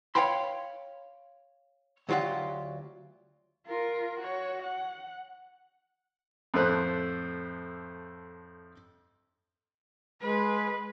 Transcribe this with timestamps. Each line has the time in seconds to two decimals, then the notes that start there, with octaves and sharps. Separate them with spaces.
0.15 C#5 D#5 F5 G5 B5 C6
2.09 D2 F#3 F4 G4 F#5
3.67 F4 A#4
4.20 F#4 C#5
4.62 F#5
6.54 F2 A2 A3 C5 F#6
10.22 G#3 B4